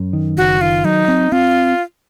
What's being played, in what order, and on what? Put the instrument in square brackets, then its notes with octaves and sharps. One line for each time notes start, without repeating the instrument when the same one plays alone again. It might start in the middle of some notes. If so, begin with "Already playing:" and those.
Already playing: [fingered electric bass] F#2
D#3
[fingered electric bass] F#1 [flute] F#4
[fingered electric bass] D#3 [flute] F4
[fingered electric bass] F#3 [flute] D#4
[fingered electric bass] C4
[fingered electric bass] C4 [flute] F4